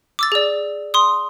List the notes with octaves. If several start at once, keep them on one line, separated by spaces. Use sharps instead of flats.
D6 E6 A6
G#4 D5
C6 D#6